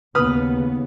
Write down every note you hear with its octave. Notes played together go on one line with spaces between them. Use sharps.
D#2 C#3 B3 B4 D#6 F6